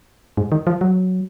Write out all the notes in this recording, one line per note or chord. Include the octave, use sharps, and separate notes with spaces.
G#2
D#3
F3
F#3